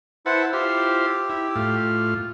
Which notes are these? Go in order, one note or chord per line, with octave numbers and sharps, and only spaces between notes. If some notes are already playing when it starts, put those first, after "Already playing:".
E4 B4 C5 E5 F#5 A5
E4 F4 G4 C5
E4
A2 F4